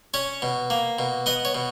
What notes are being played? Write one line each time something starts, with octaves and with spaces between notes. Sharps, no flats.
C#4 C#5
B2
A#3
B2
B3 D#5
C#5
B2